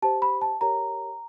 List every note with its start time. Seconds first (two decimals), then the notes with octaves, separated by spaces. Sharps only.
0.02 G4 C5 A5
0.22 B5
0.41 A5
0.61 G4 A#4 C#5 A#5